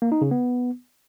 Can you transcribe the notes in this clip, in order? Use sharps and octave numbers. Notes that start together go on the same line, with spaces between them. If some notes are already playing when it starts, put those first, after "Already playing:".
A#3
D#4
C#3
B3